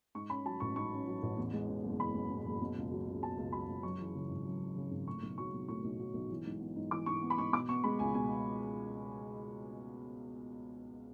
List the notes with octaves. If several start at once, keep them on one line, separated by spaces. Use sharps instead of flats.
G#2 C#6
C#4 B5
F#3 A5
A1 C#6
G#2 C#6
C#4
F#3
A1
E2
G#3
B2
F#1
E2 B5
G#3
B2
F#1
B2
C#2
F#3
C#2
B2 A5
C#2
F#3 B5
C#2
F#2 C#6
E3
C#3
G#1
F#2
E3
C#3
G#1
A2 C#6
B1
F#3 C#6
B1
A2 C#6
B1
F#3
B1
E3
G#2
B3
G#2
E3 D6
G#2 C#6
B3
B5
G#2 C#6
B2 D6
B3 C#6
G#3 B5
C#2 G#5
B2 G#5
B3